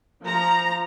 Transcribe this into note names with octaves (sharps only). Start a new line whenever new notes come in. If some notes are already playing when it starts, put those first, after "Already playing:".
F3 A#5